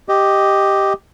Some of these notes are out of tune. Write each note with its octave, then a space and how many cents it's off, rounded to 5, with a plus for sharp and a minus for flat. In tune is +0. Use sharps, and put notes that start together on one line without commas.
G4 +0 D#5 +0